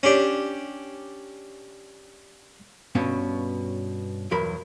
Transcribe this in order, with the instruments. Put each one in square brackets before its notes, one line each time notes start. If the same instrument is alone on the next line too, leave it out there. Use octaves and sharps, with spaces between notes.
[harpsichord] C#4 D4 G4
[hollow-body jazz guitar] G2 B2 C#4
B1 E2 F#3 A#4 B5